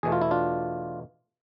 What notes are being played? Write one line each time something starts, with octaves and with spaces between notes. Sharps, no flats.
E2 B2 A3 G#4
F4
E4
D4 F4